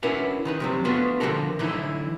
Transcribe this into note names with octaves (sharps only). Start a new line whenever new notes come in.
C#4 D4 E4 F#4 A#4 B4
D#3 D#4 B4
F2 C3 F#3
A3 B3 D4 F4 F#4 B4
D3 F3 D4 F#4 A4 A#4
D3 E3 F#3 A3 D#4 E4